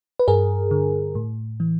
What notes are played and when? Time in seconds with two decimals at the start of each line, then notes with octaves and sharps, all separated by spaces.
0.20 B4
0.28 G2 G#4 A#4
0.71 D3
1.15 A2
1.60 E3